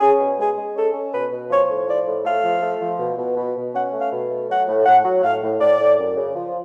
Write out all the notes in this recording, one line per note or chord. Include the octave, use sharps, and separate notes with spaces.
C#4 G#4
B2
G#3 G#4
G#3
C#4 A4
C#4
B2 B4
B2
F3 C#5
A2
F3 D5
A2
A3 F5
F3
A3
F3
B2
B2
B2
B2
C#4 F#5
A3
F5
B2
A3
F#3 F#5
A2
A2 F#5
F#3
A2 F5
A2
A2 D5
A2
F#2
C#3
F3